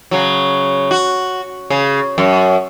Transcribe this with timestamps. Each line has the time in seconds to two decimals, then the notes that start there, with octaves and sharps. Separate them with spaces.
0.11 C#3 F#3
0.91 F#4
1.70 C#3
2.18 F#2